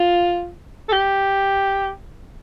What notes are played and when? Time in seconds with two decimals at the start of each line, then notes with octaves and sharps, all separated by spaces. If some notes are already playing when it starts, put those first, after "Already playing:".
Already playing: F4
0.89 A4
0.92 G4